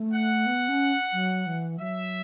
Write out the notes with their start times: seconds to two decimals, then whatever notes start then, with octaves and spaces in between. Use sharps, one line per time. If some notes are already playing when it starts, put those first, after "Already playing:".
Already playing: A3
0.13 F#5
0.46 B3
0.68 C#4
1.13 F#3
1.46 E3
1.79 F#3 E5